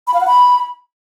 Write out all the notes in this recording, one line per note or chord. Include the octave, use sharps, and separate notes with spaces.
B5
F5
F#5
B5